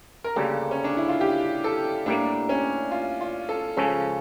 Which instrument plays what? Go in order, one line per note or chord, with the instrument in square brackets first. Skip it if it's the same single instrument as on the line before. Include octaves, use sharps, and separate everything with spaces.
[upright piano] A#4
[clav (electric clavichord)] D2 C#3 G3 A#3 [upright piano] A4
[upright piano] C#4
D4
E4
F4
G4
A4
[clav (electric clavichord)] A2 G3 A#3 [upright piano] D4
[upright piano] C#4
F4
F4
A4
[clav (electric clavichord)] C#2 C#3 F3 C#4 [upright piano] A4